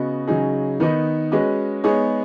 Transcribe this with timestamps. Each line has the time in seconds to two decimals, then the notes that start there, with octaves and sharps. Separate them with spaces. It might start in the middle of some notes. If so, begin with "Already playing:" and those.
Already playing: C#3 B3 F#4 D#5
0.27 C#3 F#3 D#4 G#4
0.80 D#3 B3 D#4 B4 D#5
1.32 G#3 C#4 F#4 B4 D#5
1.84 G#3 B3 D#4 G#4 C#5